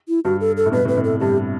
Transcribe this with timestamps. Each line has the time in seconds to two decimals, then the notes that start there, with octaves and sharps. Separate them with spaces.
0.09 E4
0.25 G2 F#4
0.40 A4
0.57 A4
0.66 A2
0.72 G2 B2 B4
0.85 A2 C3
0.88 B4
0.96 A2 C3
1.04 A4
1.20 G2 G4